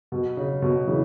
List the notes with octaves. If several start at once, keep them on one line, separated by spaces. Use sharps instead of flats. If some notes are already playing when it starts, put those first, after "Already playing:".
B2
C#3
B2
C#3 E3